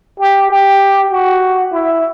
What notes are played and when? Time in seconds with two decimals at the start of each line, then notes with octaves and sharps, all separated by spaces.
0.20 G4
0.50 G4
1.11 F#4
1.72 E4